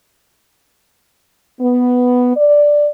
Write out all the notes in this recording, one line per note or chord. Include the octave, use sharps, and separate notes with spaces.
B3
D5